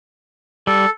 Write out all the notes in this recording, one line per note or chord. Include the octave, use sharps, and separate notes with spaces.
G3 A4